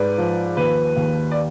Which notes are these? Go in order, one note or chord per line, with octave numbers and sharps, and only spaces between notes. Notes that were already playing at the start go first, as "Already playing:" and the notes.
Already playing: G#2 B4 D5
F3
D#2 B4
D#2
D5